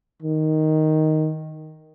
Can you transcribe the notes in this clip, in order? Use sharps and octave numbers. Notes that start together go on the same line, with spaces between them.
D#3